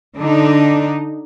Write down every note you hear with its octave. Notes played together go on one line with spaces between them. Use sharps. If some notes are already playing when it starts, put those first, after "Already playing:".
D3 D4 D#4